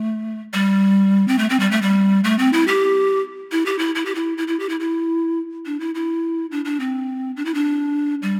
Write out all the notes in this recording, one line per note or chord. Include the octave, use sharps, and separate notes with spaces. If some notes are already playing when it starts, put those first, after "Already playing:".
Already playing: A3
G3
C4
A3
C4
G3
A3
G3
A3
C4
E4
G4
E4
G4
E4
E4
G4
E4
E4
E4
G4
E4
E4
D4
E4
E4
D4
D4
C4
D4
E4
D4
G3